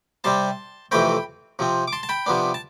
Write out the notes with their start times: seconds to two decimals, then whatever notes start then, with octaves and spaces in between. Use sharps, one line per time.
0.24 C3 G3 C4 A5 C6
0.91 F2 C3 E3 A3 C4 G5 B5
1.59 C3 F3 C4
1.88 D6
1.93 A5 C6
2.03 A5
2.09 G5 B5
2.26 C3 F3 B3 D4
2.54 A5